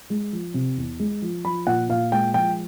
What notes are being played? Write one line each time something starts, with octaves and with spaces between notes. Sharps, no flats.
G#3
F3
C3
E2
G#3
F3
F3 B5
A#2 F#5
A#2 F5
G#3 G5
F3 G5